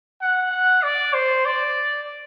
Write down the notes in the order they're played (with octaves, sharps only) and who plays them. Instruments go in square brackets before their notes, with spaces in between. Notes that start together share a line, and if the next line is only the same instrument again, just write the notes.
[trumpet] F#5
F#5
D5
C5
D5